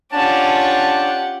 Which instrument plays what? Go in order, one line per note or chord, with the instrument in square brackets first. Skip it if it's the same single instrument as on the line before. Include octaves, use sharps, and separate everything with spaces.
[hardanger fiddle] C#4 F4 [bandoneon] D4 [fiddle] G4 F#5 [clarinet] A5